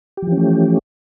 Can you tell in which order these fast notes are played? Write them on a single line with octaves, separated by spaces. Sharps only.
G4 F3 E3 C#4 A3